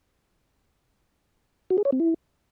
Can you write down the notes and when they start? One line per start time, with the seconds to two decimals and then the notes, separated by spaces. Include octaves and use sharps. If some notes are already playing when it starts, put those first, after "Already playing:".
1.70 F#4
1.78 G#4
1.85 C#5
1.92 C4
2.00 E4